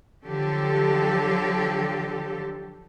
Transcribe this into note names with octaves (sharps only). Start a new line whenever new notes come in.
D3 F3 F#3 G4 A4